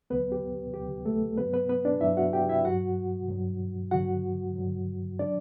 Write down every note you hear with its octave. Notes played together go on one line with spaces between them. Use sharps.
D2 D3 F#3 B3 B4
G4
D2 D3 F#3 G4
A3 A4
G2 F#3 B3 B4
B3 B4
B3 B4
D4 D5
G2 F#3 E4 E5
F#4 F#5
G4 G5
E4 E5
G2 F#3 F#4 F#5
G2 F#3
G2 D3 F#3 F#4 F#5
G2 D3 F#3
D3 F#3 D4 D5